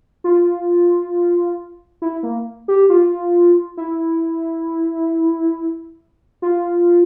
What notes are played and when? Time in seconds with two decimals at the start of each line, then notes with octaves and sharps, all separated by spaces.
0.24 F4
2.02 E4
2.23 A#3
2.68 G4
2.90 F4
3.77 E4
6.42 F4